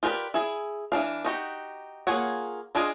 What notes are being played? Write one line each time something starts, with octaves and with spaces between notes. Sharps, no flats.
F4 G4 A#4 B4 D5
E4 G#4
E3 F3 D4 F5
D#4 F#4 G4
A#3 F4 G#4 C#5 F#5
G#3 D4 F4 G#4 D#5